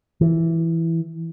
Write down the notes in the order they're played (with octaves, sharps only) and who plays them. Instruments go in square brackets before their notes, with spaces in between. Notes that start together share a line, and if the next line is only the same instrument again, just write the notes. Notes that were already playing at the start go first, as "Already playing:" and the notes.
[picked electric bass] E3